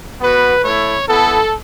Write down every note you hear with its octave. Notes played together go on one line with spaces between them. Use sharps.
B3 F#4 B4
A3 E4 C#5
B3 E4 A4